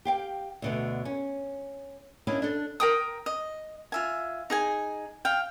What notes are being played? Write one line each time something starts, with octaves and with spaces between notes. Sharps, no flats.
G4 F5 G5
D2 B2 D3
C#4
A#3 C#4 D4 E4 D#5 F5
D4 A4
A#4 G5 D#6
D#5
F4 E5 G#5
D#4 G#4 G#5
F5 G5